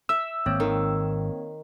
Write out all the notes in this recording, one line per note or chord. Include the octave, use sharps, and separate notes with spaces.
E5 E6
G#1 A#3 C4 C#5
D#3